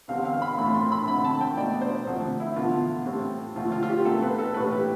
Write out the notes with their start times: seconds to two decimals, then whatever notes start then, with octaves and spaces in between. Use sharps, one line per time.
0.08 E2 D3 G3 C4 F5
0.25 F5
0.42 B5
0.58 A2 F3 A3 C4 B5
0.74 C6
0.92 B5
1.08 F2 D3 A3 C4 B5
1.25 A5
1.41 G5
1.57 B1 B2 A3 D5
1.82 C5
2.07 D2 C3 F3 A3
2.40 E4
2.56 E2 D3 F3 B3 F4
3.06 A2 G3 C4
3.56 D2 C3 F3 A3 C4 F4
3.72 F4
3.83 F4
3.89 G4
4.05 B1 B2 A3 C4 A4
4.22 B4
4.39 A4
4.54 A1 A2 G3 B4
4.72 G4